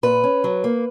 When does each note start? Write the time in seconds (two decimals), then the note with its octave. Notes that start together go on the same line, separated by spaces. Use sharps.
0.03 A#2 B4
0.24 C#4
0.44 F#3
0.64 A#3